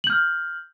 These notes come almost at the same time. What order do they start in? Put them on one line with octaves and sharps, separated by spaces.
F#7 G6 F6